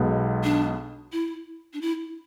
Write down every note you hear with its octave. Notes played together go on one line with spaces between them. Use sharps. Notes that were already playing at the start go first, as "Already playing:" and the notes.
Already playing: B1 B2 G#3 B3
D4
E4
D4
E4